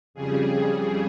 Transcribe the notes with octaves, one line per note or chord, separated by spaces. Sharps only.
F2 C#3 G3 G#4